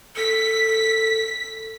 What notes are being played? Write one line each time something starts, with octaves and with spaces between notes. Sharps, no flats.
A4 B6